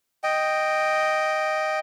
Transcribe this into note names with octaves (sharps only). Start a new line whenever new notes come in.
D#5 G5